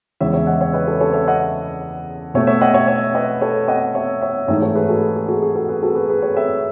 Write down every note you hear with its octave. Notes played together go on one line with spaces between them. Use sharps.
E2 C#3 G#3 C#5 E5
C#5 E5
D#5 F#5
C#5 E5
B4 D#5
A4 C#5
A4 C#5
C#5 E5
D#5 F#5
B2 A3 C#5 E5
C#5 E5
D#5 F#5
C#5 E5
C#5 E5
B4 D#5
A4 C#5
D#5 F#5
C#5 E5
C#5 E5
G#2 E3 A3 C#5 E5
A4 C#5
G#4 B4
F#4 A4
G#4
G#4
F#4 A4
G#4
F#4 A4
G#4 B4
F#4 A4
G#4 B4
G#4 B4
A4 C#5
C#5 E5